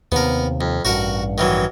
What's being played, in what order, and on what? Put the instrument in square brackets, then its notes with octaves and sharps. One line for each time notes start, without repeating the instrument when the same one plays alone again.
[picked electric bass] D#2 C3 [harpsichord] B3 A#4
[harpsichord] F2
[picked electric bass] A1 G2 [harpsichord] F#4 A#4 F#5
[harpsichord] D#3 E3 F#3